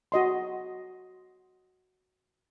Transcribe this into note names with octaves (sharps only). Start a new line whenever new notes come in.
F#4 D#5 C6